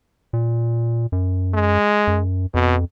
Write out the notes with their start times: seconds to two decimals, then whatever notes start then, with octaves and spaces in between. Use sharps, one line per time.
0.33 A#2
1.12 F#2
1.54 G#3
2.07 F#2
2.54 F2 B2